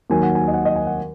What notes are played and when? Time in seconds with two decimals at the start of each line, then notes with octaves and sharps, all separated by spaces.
0.10 D#2 D#3 F#3 G#5
0.23 F#5
0.35 G#5
0.48 D#5
0.54 F#5
0.65 D#5
0.76 G#5
0.87 F#5